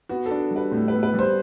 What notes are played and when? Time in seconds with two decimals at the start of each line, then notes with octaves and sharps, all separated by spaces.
0.09 B3 F#4
0.26 A4
0.31 D4
0.51 G3
0.56 B4
0.72 A2
0.88 B4
0.93 B3
1.03 B4
1.14 G3
1.19 C5